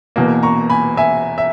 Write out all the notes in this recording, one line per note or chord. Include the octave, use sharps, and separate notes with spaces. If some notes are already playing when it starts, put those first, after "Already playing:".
E1 E2 B2 A#3
A#5 C#6
G#5 B5
E5 G#5
E5